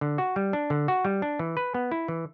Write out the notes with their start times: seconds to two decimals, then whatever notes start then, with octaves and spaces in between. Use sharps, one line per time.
0.01 D3
0.18 F#4
0.36 G3
0.53 D4
0.70 D3
0.88 F#4
1.05 G3
1.22 D4
1.39 E3
1.57 B4
1.74 B3
1.91 E4
2.08 E3